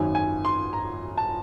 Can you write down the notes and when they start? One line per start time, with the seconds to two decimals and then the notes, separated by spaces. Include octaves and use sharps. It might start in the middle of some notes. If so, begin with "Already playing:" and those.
Already playing: G#1 F#2 D#3 G#5
0.15 G#5
0.45 C6
0.73 A#5
1.18 A5